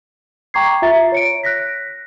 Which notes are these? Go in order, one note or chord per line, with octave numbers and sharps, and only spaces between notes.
G5 A#5 C#6 D6 G#6 C7
F4 E5 A#5 A6
C#5 C#7 D7
F#6 A#6 B6